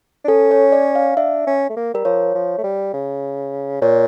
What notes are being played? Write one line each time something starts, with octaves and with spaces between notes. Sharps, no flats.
D4
C#4 A4
C#5
D5
F5
D4 E5
C#4
A3
A#3
G3 A#4
F3 C#5
F3
A3
G3
C#3
A#2 C#5